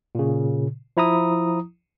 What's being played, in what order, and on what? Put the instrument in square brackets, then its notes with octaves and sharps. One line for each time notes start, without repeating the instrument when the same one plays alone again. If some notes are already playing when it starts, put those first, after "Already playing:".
[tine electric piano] A#2 C#3
F3 E4 A#5 D#6